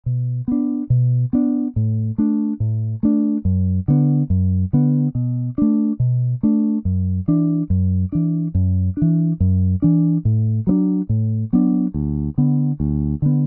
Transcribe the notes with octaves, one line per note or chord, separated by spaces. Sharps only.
B2
B3 D4
B2
B3 D4
A2
A3 D4
A2
A3 D4
F#2
D3 B3
F#2
D3 B3
B2
A3 D4
B2
A3 D4
F#2
E3 D4
F#2
E3 D4
F#2
E3 D4
F#2
E3 D4
A2
F#3 B3 D4
A2
F#3 B3 D4
D2
D3 B3
D2
D3 B3